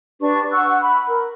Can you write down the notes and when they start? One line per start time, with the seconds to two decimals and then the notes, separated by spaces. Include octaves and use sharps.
0.21 D4 G4 B4 C#6
0.52 F#5 C#6 E6 F#6
0.80 B5
1.08 A#4